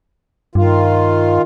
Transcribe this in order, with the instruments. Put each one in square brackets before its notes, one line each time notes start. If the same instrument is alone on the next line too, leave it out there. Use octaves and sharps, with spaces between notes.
[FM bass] G2 [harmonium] D#3 F4